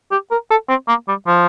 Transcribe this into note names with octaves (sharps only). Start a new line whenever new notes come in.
G4
A#4
A4
C4
A#3
G3
F3